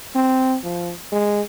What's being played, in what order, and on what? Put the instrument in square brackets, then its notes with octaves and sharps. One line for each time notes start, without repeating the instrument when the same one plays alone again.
[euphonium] C4
F3
G#3